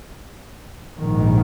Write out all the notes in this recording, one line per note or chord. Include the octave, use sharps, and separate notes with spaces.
A#1 G#2 D#3